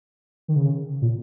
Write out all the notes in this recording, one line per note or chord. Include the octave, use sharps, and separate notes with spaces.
D#3
C#3
A#2